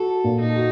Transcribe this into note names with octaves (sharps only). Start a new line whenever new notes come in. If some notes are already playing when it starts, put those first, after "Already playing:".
Already playing: F#4 A4
A#2
D#4
F#4